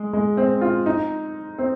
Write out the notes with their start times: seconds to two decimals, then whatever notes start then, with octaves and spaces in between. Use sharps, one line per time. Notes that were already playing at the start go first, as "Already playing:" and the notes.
Already playing: G#3
0.13 G#3
0.37 C4
0.61 F4
0.86 D#4
1.58 C4